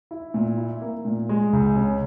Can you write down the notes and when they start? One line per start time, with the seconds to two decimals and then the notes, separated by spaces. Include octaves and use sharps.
0.11 E4
0.34 A#2
0.58 E4
0.82 A#3
1.05 A#2
1.29 G#3
1.53 C#2
1.76 C#3